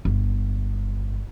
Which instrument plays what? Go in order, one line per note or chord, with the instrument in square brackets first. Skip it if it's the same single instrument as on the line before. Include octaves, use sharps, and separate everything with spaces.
[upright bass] G1